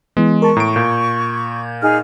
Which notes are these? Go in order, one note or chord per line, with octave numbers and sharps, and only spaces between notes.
E3 G#3 B3
A#4 A5 C#6
A2 A#5 D7
A#2 G6 G#6
D#4 G#4 F6